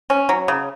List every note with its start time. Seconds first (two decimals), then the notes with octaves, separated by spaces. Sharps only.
0.10 C#4
0.29 F#3
0.48 C#3